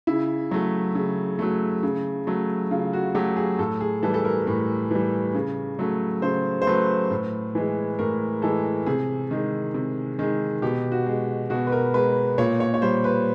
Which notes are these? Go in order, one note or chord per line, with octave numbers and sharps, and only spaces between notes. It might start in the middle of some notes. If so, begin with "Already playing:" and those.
C#3 E4
F#3 A3
C#3
F#3 A3
C#3
F#3 A3
C#3 F4
F#4
F#3 A3 G4
G#4
A2 A4
G#4
E3 G3 A4
A4
A#4
A2 A#4
E3 G3
C#3
F#3 A3
C#3 C5
C5
F#3 A3 B4
A2
E3 G#3
A2 A#4
E3 G#3 A4
C3 G#4
D#3 G#3
C3
D#3 G#3
B2 G4
F#4
G#3
B2 F#4
B4
A#4
G#3 B4
A#2 C#5
C#5
C#5
G3 C5
B4